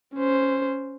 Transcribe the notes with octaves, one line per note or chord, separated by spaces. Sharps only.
C#4 C5